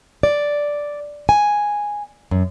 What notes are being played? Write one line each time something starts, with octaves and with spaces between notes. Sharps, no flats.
D5
G#5
F#2